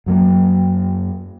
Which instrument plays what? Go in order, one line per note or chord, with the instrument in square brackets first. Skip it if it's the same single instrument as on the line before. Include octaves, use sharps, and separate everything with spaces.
[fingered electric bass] F#2 F#3 A#3